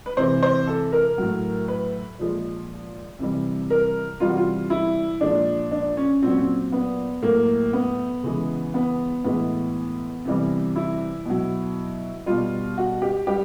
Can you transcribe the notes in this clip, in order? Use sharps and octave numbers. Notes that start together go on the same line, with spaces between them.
B4
C3 E3 G#3 C5
C5
A4
A#4
A2 F#3
B4
A#2 F3 G#3
C3 E3 G3
A#4
C3 E3 G3 F4
F#4
F4
E4
A#2 F3 G#3 D4
D4
C#4
A#2 F#3 C4 C#4
C4
B3
A2 F#3 A#3
B3
C#3 E3 G#3
B3
A2 E3 G#3 B3
C3 E3 G3
E4
B2 F#3
B2 G3 F4
F#4
G4
G3 G4